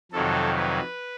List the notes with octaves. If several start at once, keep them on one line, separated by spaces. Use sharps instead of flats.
F2 C3 D#3 F#3 A4
B4